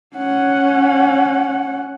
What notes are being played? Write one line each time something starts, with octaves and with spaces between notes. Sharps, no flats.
C#4 F#5